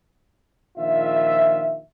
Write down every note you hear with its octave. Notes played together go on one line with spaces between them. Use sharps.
A#1 D#3 F4 E5